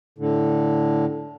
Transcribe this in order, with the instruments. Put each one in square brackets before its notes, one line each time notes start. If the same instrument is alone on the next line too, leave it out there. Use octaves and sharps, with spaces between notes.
[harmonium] A2 D3